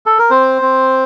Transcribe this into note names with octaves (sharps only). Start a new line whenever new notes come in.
A4
A#4
C4 C5
C4